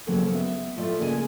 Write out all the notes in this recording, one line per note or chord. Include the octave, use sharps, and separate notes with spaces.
C#3 F#3 A#3 C4 A4
B3 E5
A2 A3 F4 D5 E5
C#3 A3 A#3 G#4 D#5 G#5